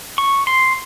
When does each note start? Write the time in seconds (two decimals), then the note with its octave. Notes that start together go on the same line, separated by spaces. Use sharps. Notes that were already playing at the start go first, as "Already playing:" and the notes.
0.18 C#6
0.47 C6